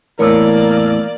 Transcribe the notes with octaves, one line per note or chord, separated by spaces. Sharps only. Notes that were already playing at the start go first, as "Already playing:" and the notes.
E2 A2 E3 A#3 A#4 C#5 D5